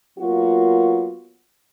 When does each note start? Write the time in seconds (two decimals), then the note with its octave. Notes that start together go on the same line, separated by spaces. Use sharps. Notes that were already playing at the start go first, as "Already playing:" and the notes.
0.18 F#3 A#3 B3 F4 F#4